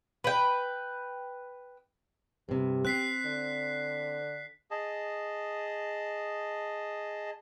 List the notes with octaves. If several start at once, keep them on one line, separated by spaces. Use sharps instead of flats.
B4 G5
G2 C3 G4
C4 F#6 B6 C7
D3
G#4 D#5 A5